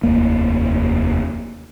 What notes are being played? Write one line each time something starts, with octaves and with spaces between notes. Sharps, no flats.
F1 D#2 A#3